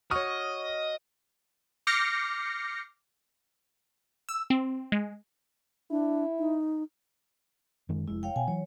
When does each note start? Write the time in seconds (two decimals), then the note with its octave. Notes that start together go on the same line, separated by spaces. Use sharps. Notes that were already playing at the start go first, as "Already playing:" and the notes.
0.11 F#4 C#5 D#5 C#6 D#6 F6
1.87 D6 F6 G6 A#6 C7 C#7
4.29 E6
4.50 C4
4.92 G#3
5.91 D4 E4
6.39 D#4
7.89 F#2 D#3 G#3
8.08 F1 G#3 E4
8.23 C#5 F5 G5
8.36 B2 F#5 G#5
8.48 E3 F#3 C#5